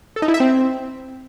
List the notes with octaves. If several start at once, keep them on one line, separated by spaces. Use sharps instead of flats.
A4
D#4
E4
E5
C4